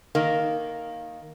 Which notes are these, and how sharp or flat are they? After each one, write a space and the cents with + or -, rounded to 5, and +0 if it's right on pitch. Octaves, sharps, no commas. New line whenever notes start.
D#3 +0 A#3 +0